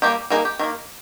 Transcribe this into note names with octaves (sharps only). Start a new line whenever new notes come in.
G3 A#3 D#4 G4
G3 A#3 D#4 G#4
G4
D#3 G3 A#3